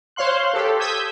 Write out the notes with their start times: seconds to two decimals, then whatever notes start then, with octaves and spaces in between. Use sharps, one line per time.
0.16 C5 C#5 F5 C6 F#6
0.54 G4 A4
0.80 D#6 E6 G6 G#6 B6